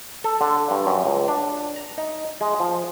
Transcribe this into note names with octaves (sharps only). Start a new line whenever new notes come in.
A4
D3
G2
F#2
C#2
D4
A#5
D#4
G#3
F3